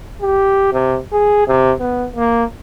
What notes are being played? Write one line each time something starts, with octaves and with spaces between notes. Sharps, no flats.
G4
C3
G#4
C3
B3
A#3